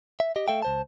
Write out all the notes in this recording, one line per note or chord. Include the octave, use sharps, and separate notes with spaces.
E5
G4 D#5
A3 A4 E5 F5 G5
C#2 C5 A5